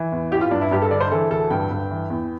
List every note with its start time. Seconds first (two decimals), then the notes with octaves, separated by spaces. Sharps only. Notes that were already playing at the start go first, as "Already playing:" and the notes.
Already playing: E3
0.12 E2
0.31 A1 G4
0.41 F4
0.51 G2 D4
0.61 E4
0.71 G2 G4
0.82 A4
0.91 D3 D5
1.01 C5
1.11 E3 A4
1.31 D2 A4
1.51 G2 G5
1.71 G2
1.91 E3
2.10 E2